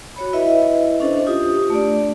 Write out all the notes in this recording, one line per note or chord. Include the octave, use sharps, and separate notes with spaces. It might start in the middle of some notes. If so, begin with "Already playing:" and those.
F#4 C#5 B5
E4 B4 D#5 E5
C#4 D4 A4 C5 D#5
F4 G4 D#6
A3 D4 D5